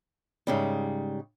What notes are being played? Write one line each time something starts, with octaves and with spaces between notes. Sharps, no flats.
G#2 C#3 G3